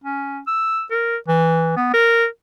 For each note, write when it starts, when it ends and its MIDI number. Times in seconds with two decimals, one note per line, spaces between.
0.04 0.39 61
0.47 0.83 88
0.91 1.16 70
1.28 1.74 52
1.76 1.91 59
1.94 2.26 70